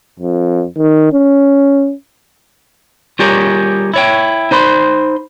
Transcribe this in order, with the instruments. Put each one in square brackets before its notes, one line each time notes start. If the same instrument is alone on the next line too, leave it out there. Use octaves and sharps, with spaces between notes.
[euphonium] F2
D#3
C#4
[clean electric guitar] G3 F4 G4 G#4 A#4 C#5
E4 C#5 G5
D#4 C5 B5 C6